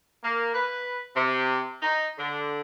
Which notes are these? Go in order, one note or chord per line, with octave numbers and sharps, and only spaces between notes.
A#3
B4
C3
D#4
D3